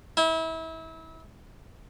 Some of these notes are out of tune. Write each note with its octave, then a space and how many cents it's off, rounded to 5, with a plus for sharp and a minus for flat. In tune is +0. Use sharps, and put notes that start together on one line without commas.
E4 -30